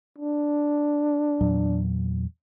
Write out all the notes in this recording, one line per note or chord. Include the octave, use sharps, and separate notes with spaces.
D4
E2 A#2 F#3